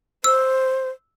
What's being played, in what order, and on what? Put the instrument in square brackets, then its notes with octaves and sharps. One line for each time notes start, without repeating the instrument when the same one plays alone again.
[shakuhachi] C5 [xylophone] E6